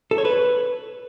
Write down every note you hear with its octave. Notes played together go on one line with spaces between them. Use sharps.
A4
C#5
B4